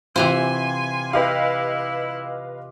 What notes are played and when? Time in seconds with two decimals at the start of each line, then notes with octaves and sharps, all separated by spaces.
0.16 C3 E3 F4 G4 C5 G5 G#5 C6
1.13 E4 G4 B4 D#5 F5